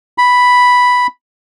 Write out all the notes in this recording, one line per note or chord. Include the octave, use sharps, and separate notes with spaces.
B5